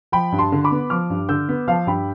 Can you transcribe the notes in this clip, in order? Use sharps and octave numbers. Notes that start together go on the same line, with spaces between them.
F3 G5 B5
G2
A5 C6
D3
B5 D6
B3
F3 D6 F6
G2
D3 E6 G6
B3
F3 F5 A5
G2 G5 B5